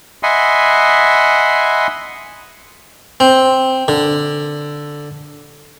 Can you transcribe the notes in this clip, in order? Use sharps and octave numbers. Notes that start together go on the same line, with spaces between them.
D#5 E5 F#5 G#5 B5 C6
C4
D3